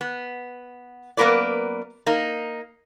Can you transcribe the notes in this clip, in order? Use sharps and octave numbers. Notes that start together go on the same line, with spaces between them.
B3
F#2 A#3 B3 A#4 B4 D5
A#3 D#4